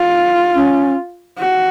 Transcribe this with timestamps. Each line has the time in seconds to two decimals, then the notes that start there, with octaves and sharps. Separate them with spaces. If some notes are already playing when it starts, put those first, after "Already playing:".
Already playing: F4
0.55 C#4
1.40 F#4